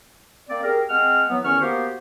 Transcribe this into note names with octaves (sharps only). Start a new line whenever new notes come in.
A#3 C4 D5
G4 G#4 A#4
G#3 C4 F#5 F6
E3 F#3 B3
E2 D#3 C#4 C#6 F6
A#3 B3 F#4 G4 C5